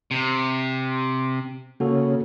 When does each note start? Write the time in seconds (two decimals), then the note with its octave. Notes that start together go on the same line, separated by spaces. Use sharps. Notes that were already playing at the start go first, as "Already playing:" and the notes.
0.11 C3
1.80 C#3 A#3 F#4 A4